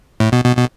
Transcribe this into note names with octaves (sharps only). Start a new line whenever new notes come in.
A2
B2
B2
B2